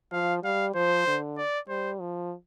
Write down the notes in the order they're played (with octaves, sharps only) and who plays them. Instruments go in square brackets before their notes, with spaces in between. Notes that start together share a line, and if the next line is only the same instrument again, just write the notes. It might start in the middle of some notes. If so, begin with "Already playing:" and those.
[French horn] F3 [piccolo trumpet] F5
[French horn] G3 [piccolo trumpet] F5
[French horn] F3 [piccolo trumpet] C5
[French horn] D3
[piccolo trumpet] D5
[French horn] G3 [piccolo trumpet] C5
[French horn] F3